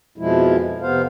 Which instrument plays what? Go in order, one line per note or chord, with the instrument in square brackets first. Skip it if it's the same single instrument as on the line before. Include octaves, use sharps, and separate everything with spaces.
[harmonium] F2 B2 F3 G#3 E4
F2 C3 B3 C5 F5